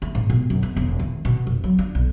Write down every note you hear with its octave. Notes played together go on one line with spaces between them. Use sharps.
A3
G#2
B2
F#2
B3
E1
D#3
B2
F1
F#3
D4
B1